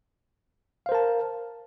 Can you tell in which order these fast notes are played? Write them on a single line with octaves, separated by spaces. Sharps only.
F5 C5 A#4 A5